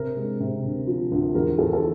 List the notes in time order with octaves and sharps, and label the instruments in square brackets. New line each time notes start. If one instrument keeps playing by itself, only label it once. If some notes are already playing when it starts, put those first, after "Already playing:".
Already playing: [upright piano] C3 A#4
G#3
C3
D2
F3
D2
E2 A#4
E2 A4
A4